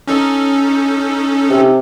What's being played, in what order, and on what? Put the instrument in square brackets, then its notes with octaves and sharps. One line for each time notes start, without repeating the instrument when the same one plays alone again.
[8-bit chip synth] C#4 D#4 A4
[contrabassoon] C3